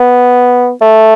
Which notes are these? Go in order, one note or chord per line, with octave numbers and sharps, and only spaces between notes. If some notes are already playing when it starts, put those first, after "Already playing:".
Already playing: B3
A3